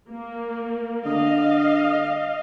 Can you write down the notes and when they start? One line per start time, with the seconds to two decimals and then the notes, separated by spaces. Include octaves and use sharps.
0.10 A#3
1.05 D3 D#5 F5